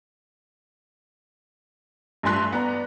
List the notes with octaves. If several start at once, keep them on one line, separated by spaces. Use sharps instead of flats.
G2 A3 G#5 C6 F#6 B6
B3 D5 A#5